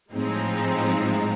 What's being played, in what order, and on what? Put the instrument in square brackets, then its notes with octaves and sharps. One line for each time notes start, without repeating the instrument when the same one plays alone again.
[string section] A2 F3 G#3 C4 D#4